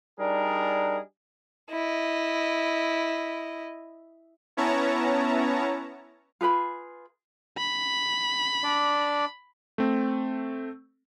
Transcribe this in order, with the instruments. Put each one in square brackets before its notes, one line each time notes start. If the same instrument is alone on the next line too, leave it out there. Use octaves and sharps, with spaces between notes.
[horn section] G3 D4 D#4 G#4 A#4
[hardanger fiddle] E4 D#5
[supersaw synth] B3 C#4 E4 C#5 A5 A#5
[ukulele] F4 G#4 B4 B5
[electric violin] B5
[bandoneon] D4 D5
[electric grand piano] A3 C4